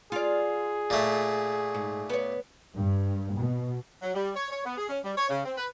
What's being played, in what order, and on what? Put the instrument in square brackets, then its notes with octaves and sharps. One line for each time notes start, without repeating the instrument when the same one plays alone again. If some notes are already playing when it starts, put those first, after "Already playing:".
[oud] F4 D5 [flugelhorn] G#4
[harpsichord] A#2 A3
[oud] G#2
B3 C#5
[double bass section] G2
B2
[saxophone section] F#3
G3
C#5
C#5
B3
G#4
C#4
G3
C#5
C#3
C4
B4